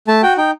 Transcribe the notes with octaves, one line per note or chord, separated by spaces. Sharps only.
A3 A5
F#4 G5
D#4 G5